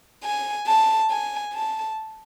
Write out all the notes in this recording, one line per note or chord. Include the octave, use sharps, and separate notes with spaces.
G#5
A5
G#5
A5